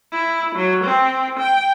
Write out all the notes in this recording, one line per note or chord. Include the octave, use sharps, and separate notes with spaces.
E4
F#3
C4
G5